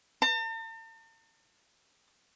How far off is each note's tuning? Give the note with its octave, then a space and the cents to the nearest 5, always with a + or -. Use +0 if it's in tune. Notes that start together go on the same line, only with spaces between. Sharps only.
A5 +45